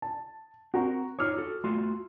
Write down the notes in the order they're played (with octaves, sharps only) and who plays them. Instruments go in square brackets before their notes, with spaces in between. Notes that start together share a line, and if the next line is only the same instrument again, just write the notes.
[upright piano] A5
[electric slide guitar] C4 A#4 [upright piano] F#4 A#5
[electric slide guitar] D#4 F4 C#5 [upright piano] D6 E6 F6
[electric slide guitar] F#4 A4
[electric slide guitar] A3 F4 F#4 [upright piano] C6